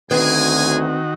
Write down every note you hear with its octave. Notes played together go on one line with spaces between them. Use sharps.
D2 D#3 B3 C4 F#4 G#4 G#5